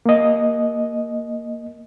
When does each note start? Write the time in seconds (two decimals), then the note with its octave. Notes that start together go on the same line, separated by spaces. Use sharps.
0.06 A#3 D#5